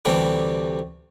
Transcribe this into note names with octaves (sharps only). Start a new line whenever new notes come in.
D2 C3 E3 G3 A3 D4